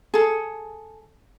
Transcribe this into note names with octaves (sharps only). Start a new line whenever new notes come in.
G#4 A4